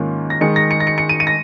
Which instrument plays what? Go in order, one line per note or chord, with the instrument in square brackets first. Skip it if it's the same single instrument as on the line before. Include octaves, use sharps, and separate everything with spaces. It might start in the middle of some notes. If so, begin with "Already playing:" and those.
Already playing: [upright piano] G#2 D#3 A#3 C#4 F4
A#6
D#3 G#3 D#4 C#7
A#6
C#7
A#6
C#7
C#7
D#7
D#7
A#6